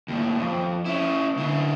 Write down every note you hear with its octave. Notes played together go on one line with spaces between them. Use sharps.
D#2 A2
F2
C#4 E4
D3 E4